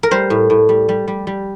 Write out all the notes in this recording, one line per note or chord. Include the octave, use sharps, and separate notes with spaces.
A#4
G3 C5
A2
A2
G3
G3
G3
G3